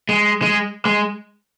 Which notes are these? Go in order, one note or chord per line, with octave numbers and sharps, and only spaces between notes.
G#3
G#3
G#3